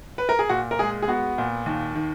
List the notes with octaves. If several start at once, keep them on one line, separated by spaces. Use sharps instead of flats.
B4
A#4
G#4
A#2 F#4
A#4
G#3 G#4
G#4
B3 F#4
A#2
D#2
D#3